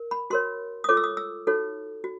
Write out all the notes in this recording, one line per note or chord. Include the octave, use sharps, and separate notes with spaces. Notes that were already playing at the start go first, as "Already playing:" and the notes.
Already playing: A#4
B5
F#4 A#4 C#5 C6
D#6
F4 A4 C#5 D6
E6
D#6
E6
D#4 F#4 A4 C#5
F#4